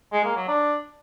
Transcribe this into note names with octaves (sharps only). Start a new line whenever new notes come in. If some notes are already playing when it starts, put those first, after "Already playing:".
G#3
A#3
F#3
D4